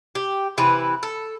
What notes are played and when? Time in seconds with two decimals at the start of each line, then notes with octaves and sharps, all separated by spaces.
0.15 G4
0.58 C3 E3 B4
1.03 A4